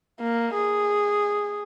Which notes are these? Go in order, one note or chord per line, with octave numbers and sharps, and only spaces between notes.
A#3
G#4